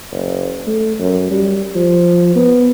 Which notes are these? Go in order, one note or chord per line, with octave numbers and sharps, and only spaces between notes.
F#1
A3
F#2
G3
F3
B3